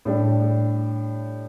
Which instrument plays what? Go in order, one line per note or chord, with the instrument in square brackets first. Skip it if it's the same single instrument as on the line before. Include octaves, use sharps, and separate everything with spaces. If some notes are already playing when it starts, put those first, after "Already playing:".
[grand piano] A2 G3 D4 G4